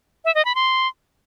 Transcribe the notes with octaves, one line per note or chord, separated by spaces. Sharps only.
E5
D#5
B5
C6